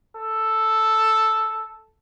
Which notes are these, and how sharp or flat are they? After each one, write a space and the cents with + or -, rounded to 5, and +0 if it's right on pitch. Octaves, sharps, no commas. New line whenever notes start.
A4 +0